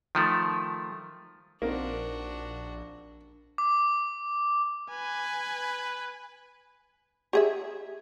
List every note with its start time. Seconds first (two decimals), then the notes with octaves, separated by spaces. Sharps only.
0.15 D#3 F3 A3
1.62 A#1 A#3 C4 D4 D#4 F#4
3.58 D6
4.90 B4 G#5
7.33 G4 G#4 E5